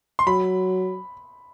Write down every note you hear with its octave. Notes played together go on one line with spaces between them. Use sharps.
C6
F#3 B5